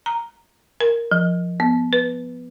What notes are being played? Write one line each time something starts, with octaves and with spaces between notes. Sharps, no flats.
A#5
A#4
F3
B3
B4